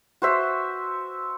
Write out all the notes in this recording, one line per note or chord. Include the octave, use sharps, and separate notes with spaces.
F#4 C5 E5